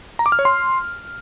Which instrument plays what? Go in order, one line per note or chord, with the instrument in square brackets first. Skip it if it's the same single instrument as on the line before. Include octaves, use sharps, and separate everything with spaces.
[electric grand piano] A#5
D6
F6
C#5
C6